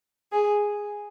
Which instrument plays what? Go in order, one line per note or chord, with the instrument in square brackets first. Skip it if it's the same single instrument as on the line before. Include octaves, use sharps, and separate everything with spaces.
[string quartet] G#4